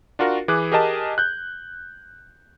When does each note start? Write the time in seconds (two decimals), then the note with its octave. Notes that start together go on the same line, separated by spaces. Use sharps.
0.19 D4 F4 F#4 A#4
0.48 E3 G#4 D6 F#6
0.72 G4 G#4 A#4 D#5 A5
1.18 F#6 G6